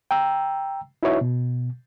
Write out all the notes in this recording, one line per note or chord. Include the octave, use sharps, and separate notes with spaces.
G5 A#5 E6
D#4 E4 F#4 B4 C#5 E5
B2